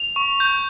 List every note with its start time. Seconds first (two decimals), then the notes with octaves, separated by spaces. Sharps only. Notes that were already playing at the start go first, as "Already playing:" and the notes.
Already playing: F7
0.16 C#6
0.40 G6